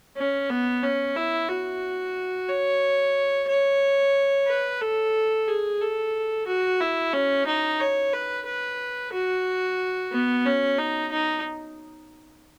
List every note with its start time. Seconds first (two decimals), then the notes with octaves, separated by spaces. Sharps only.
0.17 C#4
0.50 B3
0.83 C#4
1.16 E4
1.49 F#4
2.49 C#5
3.49 C#5
4.48 B4
4.81 A4
5.48 G#4
5.81 A4
6.47 F#4
6.80 E4
7.14 C#4
7.47 D#4
7.80 C#5
8.14 B4
8.46 B4
9.13 F#4
10.13 B3
10.46 C#4
10.79 D#4
11.12 D#4